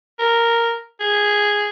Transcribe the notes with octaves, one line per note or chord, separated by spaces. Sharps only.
A#4
G#4